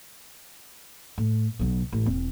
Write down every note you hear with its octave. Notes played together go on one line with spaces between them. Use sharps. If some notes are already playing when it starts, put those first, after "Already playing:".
A2
B1 F#3
A1
E1 C4